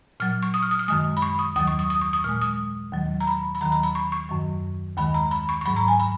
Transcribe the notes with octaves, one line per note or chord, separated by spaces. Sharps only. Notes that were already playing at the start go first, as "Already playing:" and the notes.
A#2 F#3 F6
C#6
D#6
F6
D#6
F6
F#2 D#3 G#3 D#6
B5
C#6
D#6
D#2 D#3 F#3 D#6
C#6
D#6
D#6
C#6
D#6
A#2 G#3 F6
D#6
D#2 D#3 F#3
A#5
B5
B5
D#2 D#3 F#3 A#5
A#5
B5
C#6
C#6
F#2 D#3 F#3
D#2 D#3 G#3 B5
A#5
B5
C#6
C#6
G#2 F#3 B5
A#5
G#5
B5